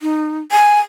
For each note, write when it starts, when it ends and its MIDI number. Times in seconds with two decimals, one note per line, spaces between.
0.01 0.41 63
0.51 0.80 80